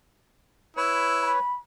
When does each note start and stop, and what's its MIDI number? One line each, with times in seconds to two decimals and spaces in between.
0.77 1.31 64
0.77 1.39 71
0.77 1.39 73
1.23 1.53 83